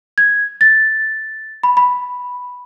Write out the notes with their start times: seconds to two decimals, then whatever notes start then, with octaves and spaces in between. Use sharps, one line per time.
0.18 G#6
0.61 A6
1.63 B5
1.77 B5